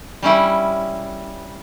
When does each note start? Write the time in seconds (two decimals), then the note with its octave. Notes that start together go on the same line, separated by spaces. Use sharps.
0.23 G3 C#4 E4